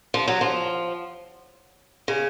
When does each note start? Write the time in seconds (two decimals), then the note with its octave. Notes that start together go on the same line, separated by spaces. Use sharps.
0.14 F3
0.28 F#3
0.41 F3
2.08 C#3